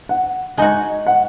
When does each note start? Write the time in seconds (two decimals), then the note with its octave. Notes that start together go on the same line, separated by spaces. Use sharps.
0.09 F#5
0.57 G#3 D#4 F#4 G#5
1.07 F#5